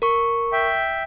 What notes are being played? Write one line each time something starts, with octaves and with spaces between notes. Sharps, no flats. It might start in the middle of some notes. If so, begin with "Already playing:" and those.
A#4 C#6
E5 G5